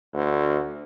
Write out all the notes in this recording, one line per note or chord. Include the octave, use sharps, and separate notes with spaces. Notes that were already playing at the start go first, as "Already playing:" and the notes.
D2